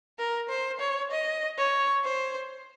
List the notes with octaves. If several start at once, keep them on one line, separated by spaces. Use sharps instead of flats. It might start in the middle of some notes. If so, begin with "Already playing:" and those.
A#4
C5
C#5
D#5
C#5
C5